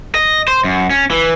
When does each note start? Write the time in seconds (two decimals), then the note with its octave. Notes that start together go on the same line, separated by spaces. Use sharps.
0.15 D#5
0.48 C5
0.64 F#2
0.90 C#4
1.11 E3